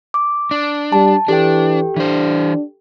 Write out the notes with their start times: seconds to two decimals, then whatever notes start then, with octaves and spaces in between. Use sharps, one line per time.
0.14 D6
0.51 D4
0.92 G3 A5
1.28 E3 D4 G4 A4 G5
1.96 E3 D4 C5